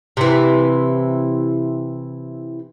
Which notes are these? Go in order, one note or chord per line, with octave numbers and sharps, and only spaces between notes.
C3 E3